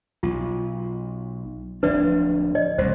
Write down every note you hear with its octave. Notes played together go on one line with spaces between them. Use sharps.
B1 F4
D1 F3 D4 B4 D5 E5
D5 D#5
E1 C2 A2 C5